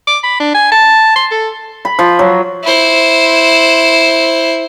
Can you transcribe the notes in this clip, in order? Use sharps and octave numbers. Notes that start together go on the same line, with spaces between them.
D6
B5
D4
G#5
A5
C6
A4
B5
F3
F#3
E4 C5